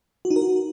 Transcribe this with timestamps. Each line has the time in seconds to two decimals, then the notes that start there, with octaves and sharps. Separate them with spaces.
0.25 F#4
0.30 D#4
0.36 A#4
0.42 F#4